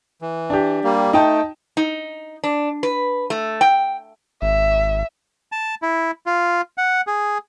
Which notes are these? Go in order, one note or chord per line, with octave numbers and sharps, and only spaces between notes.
E3
D4 G4
G3 A#3
A3 D#4 G5 A5
D#4
D4
B4
A3
G5
G#1 E5
A5
E4
F4
F#5
G#4